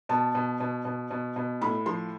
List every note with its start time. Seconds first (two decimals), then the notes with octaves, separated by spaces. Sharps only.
0.09 B2 A5
0.35 B2
0.60 B2
0.85 B2
1.11 B2
1.36 B2
1.61 A2 B5
1.86 F3 C6